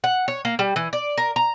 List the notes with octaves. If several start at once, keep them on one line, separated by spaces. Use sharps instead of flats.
F#5
C#5
A#3
G3
E3
D5
A#4
A#5